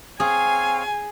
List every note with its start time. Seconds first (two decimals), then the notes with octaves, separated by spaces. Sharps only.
0.20 C4 G#4 C#5 F5 G#5